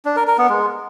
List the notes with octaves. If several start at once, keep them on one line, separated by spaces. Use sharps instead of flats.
D4
A#4
A#4
B3
G#3